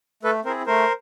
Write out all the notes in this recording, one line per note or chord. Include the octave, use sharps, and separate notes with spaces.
A3 A4 B4
C4 E4 G#4 A#4 C5
A3 A#4 C5